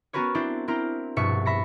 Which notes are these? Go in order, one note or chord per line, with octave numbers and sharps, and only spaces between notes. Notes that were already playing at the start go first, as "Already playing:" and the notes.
B3 C#4 F#4 A#4 B4 C#5
C4 D4 E4 C5
C4 E4 A#4 C5
A#1 G2 B2 E5 C#6 C#7
E5 B5 A#6 C#7